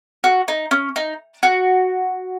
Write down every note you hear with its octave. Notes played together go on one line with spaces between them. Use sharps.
F#4
D#4
C#4
D#4
F#4